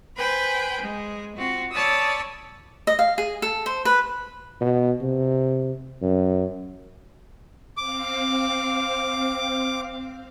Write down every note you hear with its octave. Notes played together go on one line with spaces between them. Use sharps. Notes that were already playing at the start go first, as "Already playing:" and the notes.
B4 C5 G5 G#5 B5
G#3
C4 F4 F#4
C#5 D5 A5 B5 D#6 E6
D#5
F5
G#4
A4
C5
B4
B2
C3
F#2
C4 F5 D6